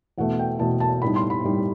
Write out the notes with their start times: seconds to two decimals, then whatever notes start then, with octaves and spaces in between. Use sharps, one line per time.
0.18 E2 B2 A3 F#5
0.39 G5
0.59 E2 B2 A3 A5
0.80 A5
1.02 A2 G3 D#4 B5
1.16 C6
1.30 B5
1.44 A2 G3 D#4